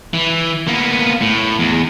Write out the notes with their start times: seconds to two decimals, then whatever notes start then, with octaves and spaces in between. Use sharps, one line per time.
0.13 E3
0.68 A#3 B3
1.21 A2
1.59 E2